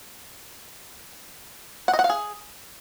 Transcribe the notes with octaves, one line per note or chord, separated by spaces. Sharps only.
F#5
D#5
F#5
F5
G#4